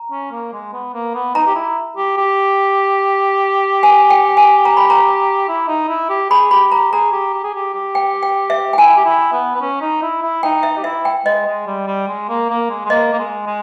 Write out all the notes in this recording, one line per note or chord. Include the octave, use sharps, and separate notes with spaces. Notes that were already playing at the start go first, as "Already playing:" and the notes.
Already playing: A#5
C#4
A#3
G#3
B3
A#3
B3
D#4 A#5
G4
E4
G4
G4
G#5
G5
G#5
A#5
B5
A#5
E4
D#4
E4
G4
G#4 B5
G4 B5
G4 A#5
G#4 A#5
G4
G4
G#4
G4
G4
G5
G5
E5
G5
E4 G#5
G4
E4
B3
B3
C#4
D#4
E4
E4
D#4 G5
E5
G4
E4 E5
G5
G#3 D#5
G#3
G3
G3
G#3
A#3
A#3
G#3
G#3
A#3 D#5
A#3
G#3
G#3